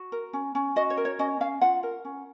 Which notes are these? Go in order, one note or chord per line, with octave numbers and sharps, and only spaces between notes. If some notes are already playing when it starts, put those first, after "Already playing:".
Already playing: F#4
A#4
C#4
C#4
F#4 D#5
C#5
A#4
C#5
C#4 D#5
C#4 F5
F4 F#5
A#4
C#4